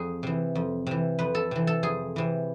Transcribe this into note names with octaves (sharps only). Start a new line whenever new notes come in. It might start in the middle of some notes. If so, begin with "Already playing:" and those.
Already playing: F2 G#4
C3 E3
F2
C3 E3
F2 B4
A4
C3 E3
A4
F2 G#4
C3 E3